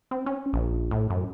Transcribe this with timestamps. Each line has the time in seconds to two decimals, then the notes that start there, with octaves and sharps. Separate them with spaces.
0.11 C4
0.26 C#4
0.53 A#1
0.91 A2
1.10 F#2